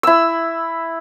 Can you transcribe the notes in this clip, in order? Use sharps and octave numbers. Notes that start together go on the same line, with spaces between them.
E4 E6